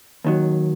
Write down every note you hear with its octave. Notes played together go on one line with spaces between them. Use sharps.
D#2 D#3 F#3